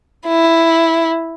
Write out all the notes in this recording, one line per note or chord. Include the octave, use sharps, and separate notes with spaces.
E4